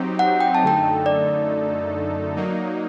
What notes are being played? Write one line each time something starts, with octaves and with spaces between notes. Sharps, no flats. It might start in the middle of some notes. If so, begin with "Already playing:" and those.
Already playing: F#3 C4 D#4 G4
F#5
G5
A5
F#2 D3 A3 D#4 A4 G5
D5
F#3 A#3 D#4